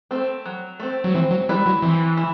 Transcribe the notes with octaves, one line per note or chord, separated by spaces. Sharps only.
A3 C4
F#3
A3 C4
F#3
E3 C4
F#3
G3 E4 B4 D5
F#3
E3 C4
E4